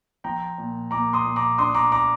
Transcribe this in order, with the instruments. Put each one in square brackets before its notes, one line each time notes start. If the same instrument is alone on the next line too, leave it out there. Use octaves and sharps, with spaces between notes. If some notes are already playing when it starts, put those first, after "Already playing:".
[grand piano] F3 G5 A#5
A#2
A#2 A#5 D6
C6 D#6
A#2
A#5 D6
D4 C6 D#6
A#5 D6
A#5 D6